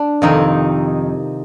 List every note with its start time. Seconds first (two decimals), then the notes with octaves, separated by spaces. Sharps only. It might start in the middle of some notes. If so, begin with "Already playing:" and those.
Already playing: D4
0.22 F2 C3 D#3 D#4